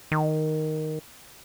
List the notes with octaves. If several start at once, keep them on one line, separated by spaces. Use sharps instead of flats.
D#3